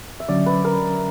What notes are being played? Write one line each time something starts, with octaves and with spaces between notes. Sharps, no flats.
E5
D3 F#3 C#4 D5
B4
A#4